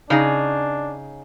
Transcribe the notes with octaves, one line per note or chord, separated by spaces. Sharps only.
C#3 D4 D#4 G#4